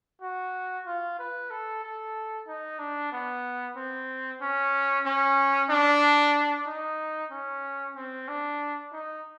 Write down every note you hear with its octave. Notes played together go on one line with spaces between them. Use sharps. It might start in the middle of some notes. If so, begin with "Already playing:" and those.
F#4
F4
B4
A4
A4
D#4
D4
B3
C4
C#4
C#4
D4
D#4
C#4
C4
D4
D#4